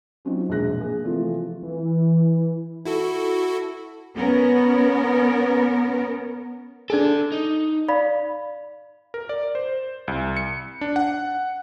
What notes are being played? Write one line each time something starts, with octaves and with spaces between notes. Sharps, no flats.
F#3 C4 C#4 D#4 F4 F#4
E1 A#1 G#3 G#4 F#6 A#6
A#3 G#4
C3 E3 F3 A3 F4
E3
E4 F#4 A4
B3 C#4 A#4
D4 G#4 A4 D5
D#4
D5 F5 B5
A#4
D5
C5
C2
C#7
D4
F#5